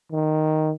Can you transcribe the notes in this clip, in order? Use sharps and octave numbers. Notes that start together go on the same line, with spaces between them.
D#3